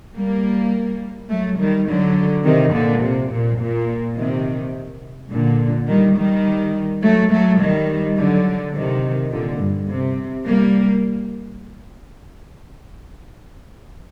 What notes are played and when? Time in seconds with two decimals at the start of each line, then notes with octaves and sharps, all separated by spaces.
0.15 G3 A#3
1.29 F#3 A3
1.58 D#3 G3
1.87 D3 F#3
2.44 C3 D#3
2.72 A#2 D3
3.01 C3
3.31 A#2
3.59 A#2
4.16 C3 D#3
5.30 A#2 D3
5.87 D#3 G3
6.16 D#3 G3
7.03 F#3 A3
7.31 F#3 A3
7.59 D#3 G3
8.17 D3 F#3
8.74 C3 D#3
9.32 A#2 D3
9.60 G2
9.89 C3
10.46 G3 A#3